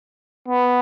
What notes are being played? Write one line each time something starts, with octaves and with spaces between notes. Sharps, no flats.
B3